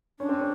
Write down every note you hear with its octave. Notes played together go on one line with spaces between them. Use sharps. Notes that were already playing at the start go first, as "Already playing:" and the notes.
C#4 D4
C4
C#4